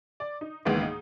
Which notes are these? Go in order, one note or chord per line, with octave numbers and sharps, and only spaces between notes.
D5
D#4
C#2 G#2 D#3 E3 A#3 B3
D#4